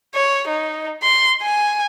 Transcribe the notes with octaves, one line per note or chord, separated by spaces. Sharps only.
C#5
D#4
C6
G#5